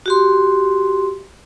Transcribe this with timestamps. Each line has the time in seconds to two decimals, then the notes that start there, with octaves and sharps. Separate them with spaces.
0.06 F#4 G4 C6